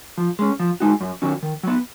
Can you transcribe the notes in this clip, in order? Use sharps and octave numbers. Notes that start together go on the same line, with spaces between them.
F3
G#3 C#4
F3
G#3 D#4 F#4
F#2
D#3 F#3 C#4
D#3
F#3 B3